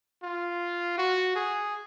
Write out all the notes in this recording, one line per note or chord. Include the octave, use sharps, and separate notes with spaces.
F4
F#4
G#4